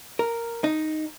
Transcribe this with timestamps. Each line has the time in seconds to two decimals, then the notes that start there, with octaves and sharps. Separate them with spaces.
0.19 A#4
0.64 D#4